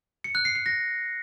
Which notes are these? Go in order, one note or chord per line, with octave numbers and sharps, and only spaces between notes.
C#7
F#6
C7
C7
A#6